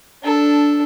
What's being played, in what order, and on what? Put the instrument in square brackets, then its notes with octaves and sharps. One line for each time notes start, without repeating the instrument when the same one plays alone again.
[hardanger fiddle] D4 A4